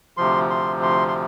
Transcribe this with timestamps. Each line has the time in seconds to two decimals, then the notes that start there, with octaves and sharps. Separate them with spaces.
0.17 D2 C3 F3 C6
0.50 C6
0.83 C6
1.08 C6